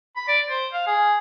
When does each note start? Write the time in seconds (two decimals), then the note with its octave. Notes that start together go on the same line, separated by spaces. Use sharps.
0.17 B5
0.28 D5
0.48 C5
0.73 F5
0.87 G#4